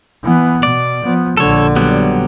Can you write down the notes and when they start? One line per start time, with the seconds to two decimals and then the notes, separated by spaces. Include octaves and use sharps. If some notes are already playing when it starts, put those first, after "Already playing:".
0.24 E3 B3
0.63 B2 D5
1.04 F3 B3
1.37 A#1 D3 A4 C#5
1.76 F#3 G3 B3